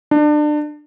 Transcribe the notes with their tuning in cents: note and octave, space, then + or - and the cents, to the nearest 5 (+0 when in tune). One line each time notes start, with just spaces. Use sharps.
D4 +30